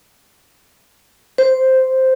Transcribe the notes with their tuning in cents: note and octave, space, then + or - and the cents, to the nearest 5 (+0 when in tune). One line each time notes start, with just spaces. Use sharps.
C5 -5